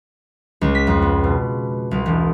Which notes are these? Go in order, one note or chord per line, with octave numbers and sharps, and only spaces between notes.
C#2
B6
F2
B3
B2
C2
E1